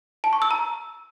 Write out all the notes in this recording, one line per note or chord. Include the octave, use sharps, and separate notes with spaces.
A5
C#6
E6
A#5